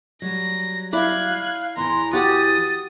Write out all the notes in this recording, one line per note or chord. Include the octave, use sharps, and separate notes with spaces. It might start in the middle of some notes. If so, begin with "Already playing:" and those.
F#3 G3 A#6
E4 D5 F5 F#6 G#6
E2 E3 A#5 C6
F#4 G4 F#5 D#6 A6